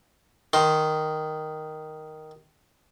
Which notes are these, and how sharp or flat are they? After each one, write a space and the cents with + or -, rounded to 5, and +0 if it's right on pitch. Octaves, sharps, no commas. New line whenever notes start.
D#3 +0 C6 +0